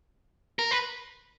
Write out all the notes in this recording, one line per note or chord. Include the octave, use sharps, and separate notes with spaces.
A#4
B4